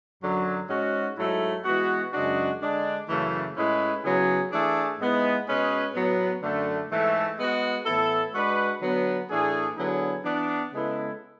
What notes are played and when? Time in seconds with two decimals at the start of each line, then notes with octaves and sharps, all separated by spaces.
0.21 F#2 D3 F#3
0.68 G#2 G#3 C#4 F#4
1.17 G#2 F#3 A3 E4 A4
1.64 E3 G#3 B3 F#4
2.12 F#2 C#3 G#3 D4 F#4
2.60 D3 G#3 D4
3.08 F#2 C#3 E3 A3
3.55 A2 G#3 C#4 E4 B4
4.03 C#3 F#3 B3 E4 G#4
4.51 E3 A3 D4 G#4
4.99 G#2 G#3 B3 E4
5.46 B2 G#3 C#4 G#4 B4
5.94 A2 F#3 B3
6.42 F#2 D3 A3
6.89 G#2 E3 A3
7.37 G#3 B3 F#4
7.85 A2 E3 B3 E4 A4
8.33 G#3 D4 F#4 B4
8.81 D3 F#3 B3
9.29 A2 E3 A3 D4 G#4
9.77 D3 F#3 B3 E4 G#4
10.24 E3 B3 D4
10.72 C#3 G#3 B3 E4 A4